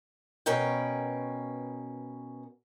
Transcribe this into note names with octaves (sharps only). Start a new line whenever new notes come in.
B2 C#4 A#4 B4 G5